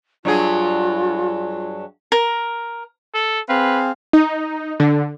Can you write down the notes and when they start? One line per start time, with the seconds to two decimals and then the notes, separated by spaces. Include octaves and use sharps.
0.25 G2 F#3 F4 G#4
2.12 A#4
3.14 A4
3.49 C4 G#4 B4 F5
4.13 D#4
4.80 D3